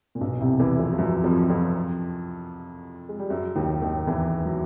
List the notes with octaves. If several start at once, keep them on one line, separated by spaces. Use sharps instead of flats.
A#2
B1 B2
C2 C3
E2 E3
F2 F3
F3
F#2 F#3
F2 F3
F2 F3
G#3
G3
F#2 F#3
D#2 D#3
D#2 D#3
E2 E3
F#3